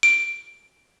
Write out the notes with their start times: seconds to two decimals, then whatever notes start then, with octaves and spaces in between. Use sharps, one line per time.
0.03 D7